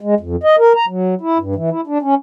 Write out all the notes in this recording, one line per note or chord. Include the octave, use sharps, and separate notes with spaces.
G#3
F2
D#5
A#4
A#5
F#3
E4
G2
E3
E4
D4
C#4